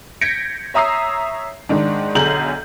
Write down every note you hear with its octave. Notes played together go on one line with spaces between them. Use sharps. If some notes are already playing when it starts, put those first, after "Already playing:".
G6 G#6 A#6 B6 C#7 D7
C#5 E5 A#5 D#6 E6 C7
G#2 D#3 D4
B1 D3 G#4 A#5 G6 F#7